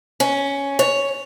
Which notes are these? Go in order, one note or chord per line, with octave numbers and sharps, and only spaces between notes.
C#4
C#5